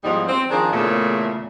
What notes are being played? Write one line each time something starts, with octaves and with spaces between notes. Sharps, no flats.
E2 G#2 F3 G3 D#4
C4
D#3 F3 C4 D4 G#4
E2 A#2 C#3 A3